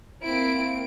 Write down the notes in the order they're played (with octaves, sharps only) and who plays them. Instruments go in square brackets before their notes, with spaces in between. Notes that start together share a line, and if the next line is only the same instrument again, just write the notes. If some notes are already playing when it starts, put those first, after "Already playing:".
[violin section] A#3 C4 D7 [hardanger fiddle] E4